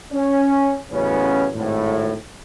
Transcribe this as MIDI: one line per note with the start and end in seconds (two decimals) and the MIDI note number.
0.13 0.74 61
0.91 1.47 33
0.91 1.47 42
0.91 1.47 49
0.91 1.47 59
0.91 1.47 61
1.54 2.15 32
1.54 2.15 45